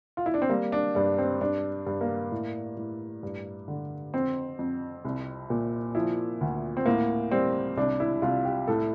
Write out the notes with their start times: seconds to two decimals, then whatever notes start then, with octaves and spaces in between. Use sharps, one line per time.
0.17 F4
0.26 E4
0.34 D4
0.42 C4
0.49 G3 A#3
0.72 D4
0.95 G2 D4
1.18 C4
1.41 G2 D4
1.86 G2
2.01 A#3
2.32 A2
2.77 A2
3.23 G2
3.68 D3
4.14 F2 C4
4.59 F2
5.05 C2
5.50 A#2
5.95 F3 E4
6.41 D2
6.77 C4
6.86 A2 A#3
7.32 G3 C4
7.77 C2 D4
8.00 E4
8.22 C2 F4
8.45 G4
8.68 A2 A4